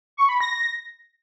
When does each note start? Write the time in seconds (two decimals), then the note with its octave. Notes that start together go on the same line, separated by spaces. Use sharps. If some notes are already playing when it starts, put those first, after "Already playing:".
0.17 C#6
0.29 B5
0.41 A#6